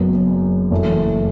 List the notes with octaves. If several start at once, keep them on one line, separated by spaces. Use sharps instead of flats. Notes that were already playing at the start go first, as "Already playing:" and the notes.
Already playing: F#1 F#2 F#3 B3
F#1 F#2 E3 A3